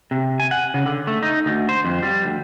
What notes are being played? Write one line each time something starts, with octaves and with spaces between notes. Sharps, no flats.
C3
G#5
F#5
C#3
D3
A3
D#4
D2
C5
F2
G3
D2